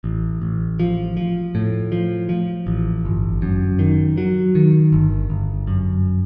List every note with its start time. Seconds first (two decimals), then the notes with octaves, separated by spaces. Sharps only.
0.04 A1
0.42 A1
0.80 F3
1.17 F3
1.55 A2
1.92 F3
2.29 F3
2.67 A1
3.05 G1
3.42 F#2
3.79 D#3
4.18 F#3
4.55 D#3
4.93 G1
5.30 G1
5.67 F#2